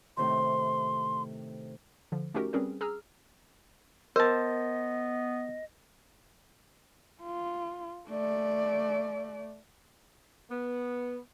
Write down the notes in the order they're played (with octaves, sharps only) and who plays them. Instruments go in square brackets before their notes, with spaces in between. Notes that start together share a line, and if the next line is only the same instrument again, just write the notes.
[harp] A2 C3 D#3 [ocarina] C6
[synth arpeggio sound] D3 F3
A3 C#4 D#4 F#4 G4 A#4
G3 C4 C#4 G#4 A#4 B4
G#4 A#5 E6 F6
[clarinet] B3 [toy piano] A#4 [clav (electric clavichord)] C5 A5 [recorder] D#5
[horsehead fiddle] F4
A3 D5
[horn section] B3